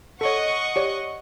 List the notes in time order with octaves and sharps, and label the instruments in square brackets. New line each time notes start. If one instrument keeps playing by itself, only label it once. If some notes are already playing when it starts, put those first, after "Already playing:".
[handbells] A4 C#5 [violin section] D#5 F#5 C#6
[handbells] G4 C#5 D5